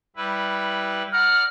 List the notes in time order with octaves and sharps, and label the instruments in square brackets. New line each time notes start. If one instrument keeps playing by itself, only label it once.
[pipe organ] G3 E4 B4
[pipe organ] D5 F#5 A#5 [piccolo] F6